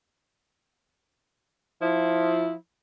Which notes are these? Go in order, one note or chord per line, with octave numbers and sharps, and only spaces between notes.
F3 E4